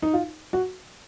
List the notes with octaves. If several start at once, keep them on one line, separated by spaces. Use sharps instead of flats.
D#4
F4
F#4